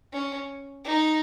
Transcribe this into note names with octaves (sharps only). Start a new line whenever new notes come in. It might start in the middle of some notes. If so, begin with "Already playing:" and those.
C#4
D#4